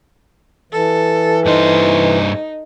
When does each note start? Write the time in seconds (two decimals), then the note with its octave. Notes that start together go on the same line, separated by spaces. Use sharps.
0.72 E3 A4
1.46 G2 D#4 C5